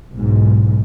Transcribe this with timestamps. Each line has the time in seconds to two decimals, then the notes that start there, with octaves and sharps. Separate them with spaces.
0.15 B1 G#2